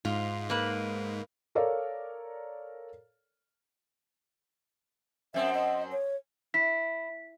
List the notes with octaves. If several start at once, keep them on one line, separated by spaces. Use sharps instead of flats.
G#2 F4
A#3 B4
A4 A#4 C#5 D5 F5
F#2 C4 E5
D#5
C#5
E4 B6